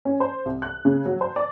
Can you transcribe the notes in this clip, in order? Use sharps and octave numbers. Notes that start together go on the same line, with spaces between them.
C#4
C5
C2
F#6
C#3
F#3
C5
D5